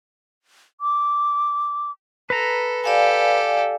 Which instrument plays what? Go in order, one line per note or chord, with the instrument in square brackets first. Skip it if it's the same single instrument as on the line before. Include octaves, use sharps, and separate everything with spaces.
[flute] D6
[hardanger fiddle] A4 [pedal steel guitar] B4 A#5
[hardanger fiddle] G4 A4 [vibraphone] D5 F5 G#5